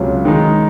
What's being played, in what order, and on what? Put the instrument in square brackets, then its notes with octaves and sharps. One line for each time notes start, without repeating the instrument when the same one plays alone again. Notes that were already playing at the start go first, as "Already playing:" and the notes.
Already playing: [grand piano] C#2 C3 F#3 C#4 F4
D#3 G#3 D#4